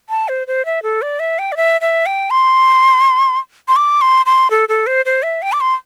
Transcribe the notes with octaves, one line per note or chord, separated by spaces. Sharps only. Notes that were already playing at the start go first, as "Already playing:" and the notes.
A5
C5
C5
E5
A4
D5
E5
G5
D5
E5
E5
G5
C6
C6
D6
C6
C6
A4
A4
C5
C5
E5
G5
D6
C6